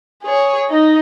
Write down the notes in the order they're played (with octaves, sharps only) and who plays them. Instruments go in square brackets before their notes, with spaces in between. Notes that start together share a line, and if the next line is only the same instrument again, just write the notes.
[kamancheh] G#4 C#5
D#4 D#5